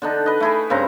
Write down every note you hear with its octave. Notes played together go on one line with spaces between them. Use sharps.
D3 D4 D#4
B4 D#5
A3 E4 G#4
G2 C#3 C4 A#5